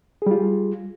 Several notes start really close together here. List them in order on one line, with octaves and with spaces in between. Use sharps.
G#4 G3 F4